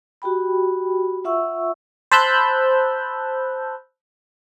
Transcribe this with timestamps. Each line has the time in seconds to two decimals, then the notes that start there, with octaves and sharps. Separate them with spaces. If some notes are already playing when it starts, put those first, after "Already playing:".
0.22 F#4 G4 G5 B5
1.25 F4 E5 F#5 C#6 E6
2.11 C5 A5 B5 E6 F#6 G6